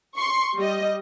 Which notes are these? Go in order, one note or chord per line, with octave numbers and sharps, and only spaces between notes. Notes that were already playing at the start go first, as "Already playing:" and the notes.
C6 C#6
G3 D#5